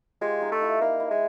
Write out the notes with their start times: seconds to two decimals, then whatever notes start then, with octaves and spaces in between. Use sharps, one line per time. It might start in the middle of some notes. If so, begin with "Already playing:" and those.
0.21 G#3 F4 G4
0.41 D#4 F4
0.52 A3
0.62 E4
0.81 A#3 D#4
1.00 E4
1.10 G#3